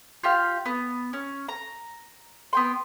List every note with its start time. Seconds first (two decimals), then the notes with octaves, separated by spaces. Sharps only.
0.23 F4 G4 F5
0.66 B3
1.13 C#4
1.49 A#5
2.53 B3 G5 C6